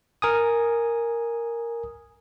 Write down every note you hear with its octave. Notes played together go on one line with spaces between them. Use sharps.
A#4 G#5 D#6